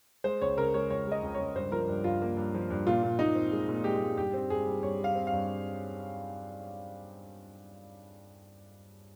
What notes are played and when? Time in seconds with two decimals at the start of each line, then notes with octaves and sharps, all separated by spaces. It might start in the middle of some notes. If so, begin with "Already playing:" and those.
0.24 G#3 C5
0.42 C#2 C#5
0.57 C#3 A#4
0.74 G#3 C#5
0.90 C#2 C#5
1.07 G#3 D#5
1.23 C#2
1.34 C#2 C#5
1.55 G2 C5
1.71 F3 A#4
1.88 G2
2.04 G2 F4
2.22 A#3
2.37 G2
2.54 F3
2.70 G2
2.87 A#2 F4
3.03 A#2
3.19 A#2 D#4
3.35 C4
3.52 G#3
3.69 A#2
3.84 G#3 G4
4.01 G#3
4.17 G2 G4
4.34 C4
4.50 G2 G#4
4.67 G3
4.83 G2 C#5
4.99 G3
5.04 F5
5.15 C4
5.27 F5
5.32 G2